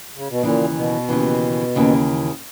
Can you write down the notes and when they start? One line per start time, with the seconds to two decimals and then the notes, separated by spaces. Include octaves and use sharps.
0.15 C#3
0.29 B2
0.42 D#2 A#2 C#3 E3
0.76 B2
1.09 D#2 C#3 E3
1.75 D#2 C#3 E3